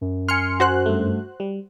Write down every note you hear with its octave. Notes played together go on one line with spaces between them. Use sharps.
F#2
G#5 C6 F6 C#7
F#4 C5 F#6
G2 A3
G3